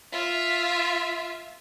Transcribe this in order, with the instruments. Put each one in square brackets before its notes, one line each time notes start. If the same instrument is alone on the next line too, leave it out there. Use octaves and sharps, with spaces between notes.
[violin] F4 E5